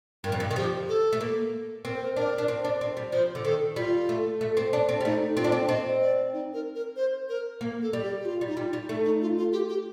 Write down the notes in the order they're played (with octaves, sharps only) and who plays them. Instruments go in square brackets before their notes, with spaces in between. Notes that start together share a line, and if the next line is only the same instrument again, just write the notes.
[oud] G2 [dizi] A#4
[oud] F2
G2
D#3
[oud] F3 [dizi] G4
[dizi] A4
[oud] A3
A#3
[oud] C4 [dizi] A#4
[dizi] C5
A#4
[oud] D4 [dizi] A#4
[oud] D4
C4
D4
C4
G3
[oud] F3 [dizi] C5
[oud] D3
[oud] D#3 [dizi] A4
[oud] G3 [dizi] F4
[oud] A3
A3
C4
D4
C4
G3
[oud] A3 [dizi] D#4
[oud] C4 [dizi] F4
[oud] D4
C4
[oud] C4 [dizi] D#5
[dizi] D5
D#4
A#4
A#4
C5
A#4
[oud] A#3
[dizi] A4
[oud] G3
[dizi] G4
G4
F4
[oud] G3
[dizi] D#4
[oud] G3 [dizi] F4
[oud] G3
[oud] A3 [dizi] D#4
[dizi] D#4
F4
F4
G4
G4